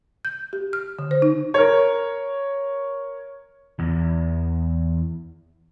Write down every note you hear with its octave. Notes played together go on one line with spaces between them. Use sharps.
G6
G4
F6
D3
C5
D#4
A#4 C#5
E2 E3